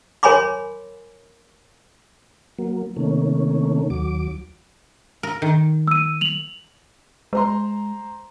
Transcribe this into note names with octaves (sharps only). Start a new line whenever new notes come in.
A#4 C#5 G#5 B5 C6 D6
F#3 A#3
C3 D#3 A3 A#3 C#4
D#2 F#3 D6
A#4
D#3
E6 D#7
F7 F#7
G#3 C5 A#5 C6